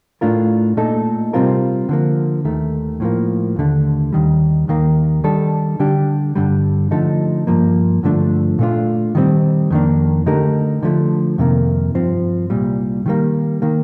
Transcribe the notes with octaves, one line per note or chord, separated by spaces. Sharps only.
A2 A3 D4 F4 A#4
A#2 A3 D#4 A4
C3 G3 C4 F4 A#4
D3 F3 A#3
D#2 D#3 A3
A2 F3 A#3
D#2 D3 A3
D#2 D#3 G3
D#2 D#3 A#3
D#3 G3 D4 A4
D3 G3 D4 G4
G2 D3 G3
D3 F3 A3 D#4 A4
G2 F3 A#3
G2 D3 F3 A3 D4
A#2 A3 D4 F4
D#3 G3 C4
F2 D#3 A#3 D4
D3 A3 D#4 G4 A#4
D3 F3 A3
F2 C3 D#3 A#3
G2 F3 C4
C2 A#2 G3
D#3 G3 A#3
D#3 A#3